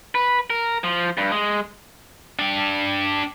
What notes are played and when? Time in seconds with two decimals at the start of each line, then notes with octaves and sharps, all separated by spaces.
0.15 B4
0.50 A#4
0.84 F3
1.18 G2
1.32 G#3
2.39 D4 G5